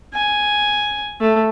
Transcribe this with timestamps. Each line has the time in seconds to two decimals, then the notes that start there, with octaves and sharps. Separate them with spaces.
0.14 G#5
1.20 A3